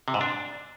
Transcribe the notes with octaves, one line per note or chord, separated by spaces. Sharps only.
C3
G#2
D4